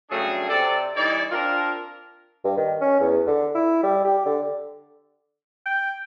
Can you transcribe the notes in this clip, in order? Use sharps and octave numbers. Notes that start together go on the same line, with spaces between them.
G2 C#3 F#3 A3 D4 G#4
C3 A4 D5
E3 G3 D#4 C#5 D5
C4 D4 F4 A#4
G2
D#3
C#4
E2
D3
E4
G3
G4
D3
G5